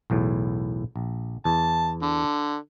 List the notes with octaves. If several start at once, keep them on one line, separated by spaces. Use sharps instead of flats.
B1 E2 A2
A#1
E2 A5
D3